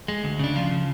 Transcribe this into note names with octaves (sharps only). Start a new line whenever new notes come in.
G#3
D2
C#3 D4
F3 F4
C#3